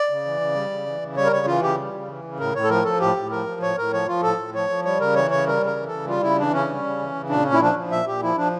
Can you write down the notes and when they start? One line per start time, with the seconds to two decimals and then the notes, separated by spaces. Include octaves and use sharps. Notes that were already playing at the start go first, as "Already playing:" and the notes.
Already playing: D5
0.10 C#3
0.25 E3
0.41 C#3
0.55 G3
0.70 C#3
0.86 E3
1.01 C#3
1.16 G3 C#5
1.25 A#4
1.32 C#3 C#5
1.47 E3 F4
1.62 C#3 G4
1.79 G3
1.94 C#3
2.09 E3
2.25 C#3
2.39 A2 A#4
2.55 A2 C#5
2.64 A4
2.69 F3 A#4
2.85 F3 A4
3.00 A2 G4
3.16 A2
3.31 F3 A#4
3.46 F3
3.62 A2 C#5
3.77 A2 A#4
3.93 F3 C#5
4.07 F3 F4
4.23 A2 A4
4.38 A2
4.54 F3 C#5
4.69 F3
4.85 G3 C#5
5.00 C#3 A#4
5.15 E3 C#5
5.31 C#3 C#5
5.46 G3 A#4
5.62 C#3 A#4
5.76 E3
5.87 C#3 A4
6.07 G3 F4
6.22 C#3 E4
6.38 E3 D4
6.53 C#3 C#4
6.69 G3
6.84 C#3
6.99 E3
7.15 C#3
7.30 A#2 D4
7.45 A#2 C#4
7.54 E4
7.61 F3 D4
7.76 F3
7.91 A#2 E5
8.06 A#2 G4
8.22 F3 E4
8.37 F3 D4